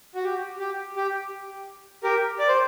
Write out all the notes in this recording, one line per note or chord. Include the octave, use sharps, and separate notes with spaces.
F#4
G4
G4
G4
G4 A#4
D5
C5